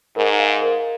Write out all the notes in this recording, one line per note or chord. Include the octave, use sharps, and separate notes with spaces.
G#2 A#4
F5
A#4